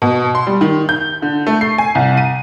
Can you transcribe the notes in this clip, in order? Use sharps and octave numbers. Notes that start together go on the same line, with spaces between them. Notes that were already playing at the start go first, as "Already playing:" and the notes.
B2
C6
G3
D#3
G6
D3
A3
C7
G#5
C2
D#7